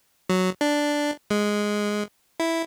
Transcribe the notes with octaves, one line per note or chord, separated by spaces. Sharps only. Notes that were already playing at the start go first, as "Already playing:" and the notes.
F#3
D4
G#3
E4